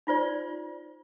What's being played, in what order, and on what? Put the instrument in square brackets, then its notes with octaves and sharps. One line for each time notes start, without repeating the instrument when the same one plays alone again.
[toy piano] D#4 F4 C5 D5